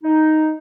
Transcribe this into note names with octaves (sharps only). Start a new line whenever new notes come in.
D#4